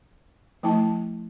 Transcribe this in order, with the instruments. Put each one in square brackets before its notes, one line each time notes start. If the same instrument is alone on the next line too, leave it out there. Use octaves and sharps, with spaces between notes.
[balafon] F3 A3 E4 A5